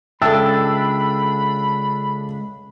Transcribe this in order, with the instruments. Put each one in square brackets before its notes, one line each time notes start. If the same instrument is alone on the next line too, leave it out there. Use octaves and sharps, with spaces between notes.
[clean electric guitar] C#2 D4 [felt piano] A4 E6 [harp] E5 G5 A5 [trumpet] B5